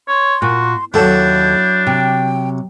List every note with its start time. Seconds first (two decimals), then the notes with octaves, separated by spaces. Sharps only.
0.08 C#5 C6
0.42 A#2 F#4
0.94 D#2 F#3 D4 E4 A4 A5 G6
1.87 C3 G5